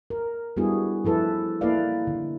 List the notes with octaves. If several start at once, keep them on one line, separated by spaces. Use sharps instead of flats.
A#4
G3 B3 D4 E4 F#4 G#4
F3 E4 A4 B4
A#3 E4 A4 B4 D5 F5
D3